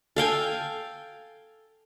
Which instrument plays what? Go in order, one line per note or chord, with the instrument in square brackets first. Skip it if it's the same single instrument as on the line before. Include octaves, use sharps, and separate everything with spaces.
[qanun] A4 F5 G5 G#5